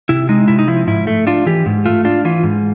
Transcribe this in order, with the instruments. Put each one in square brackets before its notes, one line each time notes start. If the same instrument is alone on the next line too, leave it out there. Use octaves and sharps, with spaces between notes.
[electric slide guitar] C3 E4
G#3 D#4
C3 E4
D#4
F3 E4
G#2 E4
A3
D4 F4
E3 G4
G#2
A3 F4
D4 F4
E3 F4
G#2